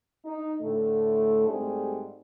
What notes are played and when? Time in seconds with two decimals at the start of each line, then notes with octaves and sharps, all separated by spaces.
0.24 D#4
0.61 A2 D3 A3
1.48 G#2 G3 A3 C4 G#4